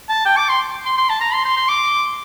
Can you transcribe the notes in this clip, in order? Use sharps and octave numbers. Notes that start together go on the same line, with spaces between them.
A5
G5
D6
C6
C6
C6
A5
A#5
C6
C6
C6
D6